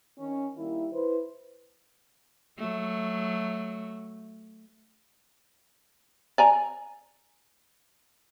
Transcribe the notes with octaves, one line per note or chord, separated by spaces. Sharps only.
D#3 C#4
D#3 G3 A#3 E4
E4 B4 C5
F#3 A3
D5 G#5 A#5